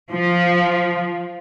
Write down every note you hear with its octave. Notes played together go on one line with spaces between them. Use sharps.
F3